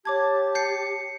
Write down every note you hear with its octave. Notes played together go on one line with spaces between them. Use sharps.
G4 C#5 A5 D6 G#6
G6 C7 C#7